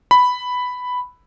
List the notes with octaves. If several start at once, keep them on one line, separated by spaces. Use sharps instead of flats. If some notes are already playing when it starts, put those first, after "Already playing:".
B5